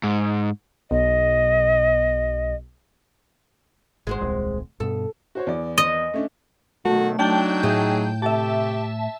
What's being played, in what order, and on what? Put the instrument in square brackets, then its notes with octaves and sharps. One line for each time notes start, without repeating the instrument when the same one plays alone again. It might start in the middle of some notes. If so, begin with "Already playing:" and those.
[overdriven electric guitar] G#2
[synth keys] B1 [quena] D#5
[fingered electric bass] G#1 [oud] G#3 F#4 C5
[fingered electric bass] D#1 C2 C3
[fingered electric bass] G2 B2 [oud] A4
[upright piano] F#4 C5 C#5
E2 D5
[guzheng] D#5
[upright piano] A3 C#4 D4
[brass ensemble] B2 D#3 F#3 [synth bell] A3 [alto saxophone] F#4
[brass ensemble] F#3 D#4 [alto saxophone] D4 [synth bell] G5 A5 G6
[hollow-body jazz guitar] A2 [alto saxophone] G#4
[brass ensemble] C3 A3 [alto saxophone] G4 [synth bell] E5 A5